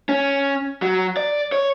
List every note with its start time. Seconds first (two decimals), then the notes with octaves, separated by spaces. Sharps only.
0.09 C#4
0.82 F#3
1.17 D5
1.52 C#5